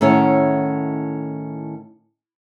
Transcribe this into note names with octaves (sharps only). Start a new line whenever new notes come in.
A2 D#3 C#4 E4 C#5 F#5